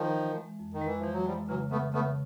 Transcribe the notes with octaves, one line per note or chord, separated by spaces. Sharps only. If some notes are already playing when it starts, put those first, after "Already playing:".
Already playing: D#3 F3
E3
G#3
F2
D#3
E3 G#3
E3 F3
F#3
F3 G3 G#3
C#3 E3 F#3
C#3 A3 B3
C#3 A3 B3